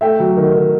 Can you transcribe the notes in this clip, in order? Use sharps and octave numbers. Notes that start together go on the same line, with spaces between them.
A3 E5 G5
F#3
D#3
D#3